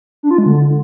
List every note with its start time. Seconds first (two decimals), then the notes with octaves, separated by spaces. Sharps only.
0.23 D4
0.31 F4
0.38 G#3
0.46 D3